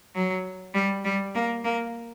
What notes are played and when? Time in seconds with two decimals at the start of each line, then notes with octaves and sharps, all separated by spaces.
0.15 F#3
0.74 G3
1.04 G3
1.35 A#3
1.64 A#3